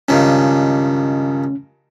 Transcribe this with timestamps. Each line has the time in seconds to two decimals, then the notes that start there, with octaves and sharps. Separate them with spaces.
0.09 C#2 G2 D#3 C#4